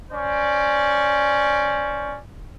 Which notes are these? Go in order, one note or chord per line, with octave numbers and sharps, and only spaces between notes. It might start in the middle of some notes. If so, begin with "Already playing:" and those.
C#4 C5 D5